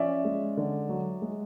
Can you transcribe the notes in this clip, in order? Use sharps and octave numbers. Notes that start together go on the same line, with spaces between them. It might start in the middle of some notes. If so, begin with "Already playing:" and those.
Already playing: F3 C#4 D5 E5
G#3
D3
F#3
G#3